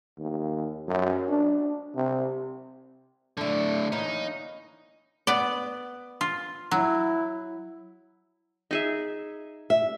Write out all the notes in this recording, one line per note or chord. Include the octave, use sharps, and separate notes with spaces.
D#2
F#2
D4
C3
A2 D3 D4 E4
E3 A#3 D#4 C#5
B3 D5
F4
F#3 E4
D#4 G#4 E5
E5